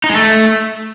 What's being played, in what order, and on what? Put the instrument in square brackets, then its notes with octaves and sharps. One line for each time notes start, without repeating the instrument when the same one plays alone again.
[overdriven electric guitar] D#4
G#3
A3